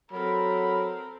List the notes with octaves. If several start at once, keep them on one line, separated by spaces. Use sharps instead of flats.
F#3 C4 A4 A#4 B5